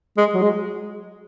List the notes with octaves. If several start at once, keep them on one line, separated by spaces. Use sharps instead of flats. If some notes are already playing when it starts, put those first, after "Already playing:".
G#3
F#3
G#3